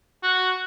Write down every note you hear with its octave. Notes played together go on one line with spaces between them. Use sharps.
F#4